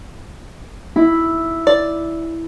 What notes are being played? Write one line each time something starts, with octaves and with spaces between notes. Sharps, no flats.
E4
D5